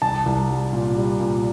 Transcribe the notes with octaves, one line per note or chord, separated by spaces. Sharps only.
C2 A5
C2
G3
A#2
G3
A#2